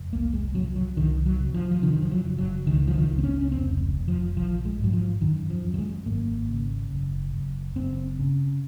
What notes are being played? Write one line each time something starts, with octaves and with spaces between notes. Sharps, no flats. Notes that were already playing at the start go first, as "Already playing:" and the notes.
Already playing: F1
C2 A#3
G#3
C3 F#3
F#3
C2 D#3
F#3
C3
F3
F3
C3 D#3
D#3
F3
F#3
F#1
F#3
C#2 D#3
F3
D#3
C#2
C4
C#4
C#4
F1 C4
F1
F3
A#1 F3
G#3
G#2 F#3
F3
F#2 D#3
F3
F#2
F#3
G#3
G#1 A#3
C#3
F#1
F#1
F#1 C4
C#3